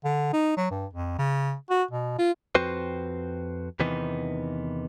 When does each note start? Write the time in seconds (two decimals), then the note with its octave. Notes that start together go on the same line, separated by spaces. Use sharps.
0.05 D3
0.33 D#4
0.57 F#3
0.71 G2
0.94 F2
1.18 C#3
1.70 F#4
1.91 B2
2.19 F4
2.55 F2 C4 F#4 B4 C5
3.80 E2 C3 D#3 E3 B3 D#4